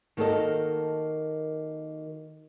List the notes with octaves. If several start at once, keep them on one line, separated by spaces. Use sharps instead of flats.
D#3 A#3 F#4 A4 D#5